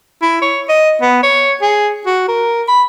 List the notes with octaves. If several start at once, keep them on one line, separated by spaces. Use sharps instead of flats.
E4
C#5
D#5
B3
C#5
G#4
F#4
A#4
B5